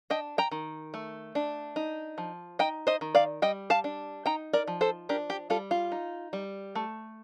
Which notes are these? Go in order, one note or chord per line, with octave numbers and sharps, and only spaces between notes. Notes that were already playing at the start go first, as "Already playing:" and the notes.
D4 D#5 G5
G5 A#5
D#3
A3
D4
D#4
F3
D#4 D#5 G5
C5 D#5
D#3
D5 F5
G3 D#5 G5
F5 A5
D4
D#4 G5 A#5
A#4 D5
F3
A4 C5
D4 G4 A#4
G4
G3 F4 A4
F4
D#4
G3
A3